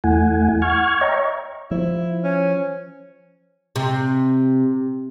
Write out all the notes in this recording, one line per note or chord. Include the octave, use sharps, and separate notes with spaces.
E2 A3 E4 F#5 G#5
F#5 C#6 F6 G#6
C#5 D#5 E5 G5 A#5 C#6
F3 E4
C#4
C3